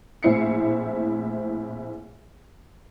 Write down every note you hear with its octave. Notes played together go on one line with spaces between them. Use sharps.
A#1 A2 C4 E4 C7 C#7